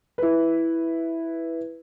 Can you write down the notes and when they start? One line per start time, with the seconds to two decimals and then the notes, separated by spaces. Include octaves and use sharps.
0.18 E4 B4